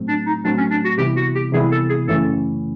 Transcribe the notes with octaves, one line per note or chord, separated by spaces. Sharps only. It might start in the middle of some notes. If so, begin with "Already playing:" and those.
Already playing: A2 F#3 A3 C4
D4
D#4
A2 F#3 A3 C4 D4
C#4
D4
F#4
C3 E3 G3 B3 E4 G4
F#4
G4
C3 E3 G3 B3 E4 G#4
A4
G#4
F#2 C#3 E3 A3 C#4 A4